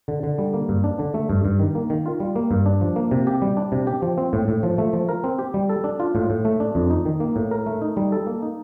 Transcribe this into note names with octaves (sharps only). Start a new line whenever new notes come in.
D3
D3
G3
A#3
G2
D4
D3
A3
G2
G2
D#3
A#3
D#3
F4
G3
A#3
G2
D4
F3
A#3
C3
G4
G3
D4
C3
G4
F3
C4
A2
A2
F3
A3
F3
A#4
C4
G4
G3
A4
D4
F4
A2
A2
A3
D4
F2
D#4
D#3
A#3
A2
A#4
A3
D#4
G3
A4
A#3
D#4